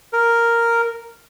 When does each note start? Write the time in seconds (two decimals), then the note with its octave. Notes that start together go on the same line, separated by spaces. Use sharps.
0.13 A#4